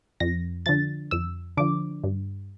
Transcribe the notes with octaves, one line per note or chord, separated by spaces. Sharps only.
F2 A#6
D3 F3 A6
F2 E6
D3 F3 D6
G2